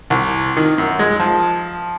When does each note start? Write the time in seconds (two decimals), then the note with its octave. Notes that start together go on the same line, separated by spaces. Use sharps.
0.10 C2
0.57 D#3
0.78 F#2
0.99 G#3
1.20 F3